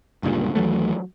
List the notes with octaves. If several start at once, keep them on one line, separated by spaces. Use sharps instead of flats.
G1 C#2 G2 A#2
D#2 E3 F#3 A3